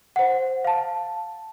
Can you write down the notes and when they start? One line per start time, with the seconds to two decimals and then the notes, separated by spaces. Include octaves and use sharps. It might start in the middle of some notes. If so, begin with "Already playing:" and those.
0.16 C5 F#5
0.65 F5 A5